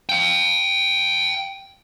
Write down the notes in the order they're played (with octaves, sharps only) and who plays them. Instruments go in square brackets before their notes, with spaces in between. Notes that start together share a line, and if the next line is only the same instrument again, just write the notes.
[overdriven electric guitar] F5 G5